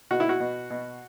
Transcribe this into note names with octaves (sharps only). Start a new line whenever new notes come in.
B2 F#4
E4
F#4
B2
B2